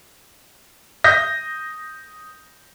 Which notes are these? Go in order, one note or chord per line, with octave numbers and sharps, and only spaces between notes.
D#6 G6 A#6